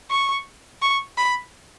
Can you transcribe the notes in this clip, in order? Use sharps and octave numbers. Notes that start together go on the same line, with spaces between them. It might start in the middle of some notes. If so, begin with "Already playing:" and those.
C#6
C#6
B5